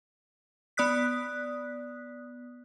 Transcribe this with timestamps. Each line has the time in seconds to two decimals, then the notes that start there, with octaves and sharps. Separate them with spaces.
0.77 B3 D5 D#6 F#6 B6